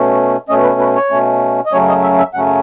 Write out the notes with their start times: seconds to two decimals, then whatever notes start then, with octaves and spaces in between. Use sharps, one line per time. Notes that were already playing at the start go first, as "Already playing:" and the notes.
Already playing: B2 A3 C#4
0.49 B2 A3 C#4 D#5
0.63 B4
0.80 B4
0.96 C#5
1.10 B2 A3 C#4
1.66 D#5
1.72 F#2 C#3 F#3 A3 C#4 C#5
1.89 D#5
2.03 E5
2.18 E5
2.34 F#2 C#3 F#3 A3 C#4 F#5